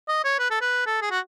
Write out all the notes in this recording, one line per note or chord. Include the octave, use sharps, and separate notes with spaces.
D#5
C#5
B4
A4
B4
A4
G#4
F#4